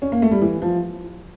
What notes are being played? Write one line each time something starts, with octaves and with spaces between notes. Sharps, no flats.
C#4
A#3
A3
G3
E3
F3